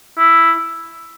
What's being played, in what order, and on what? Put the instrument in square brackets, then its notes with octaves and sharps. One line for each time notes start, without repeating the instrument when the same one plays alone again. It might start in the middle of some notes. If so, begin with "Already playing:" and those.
[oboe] E4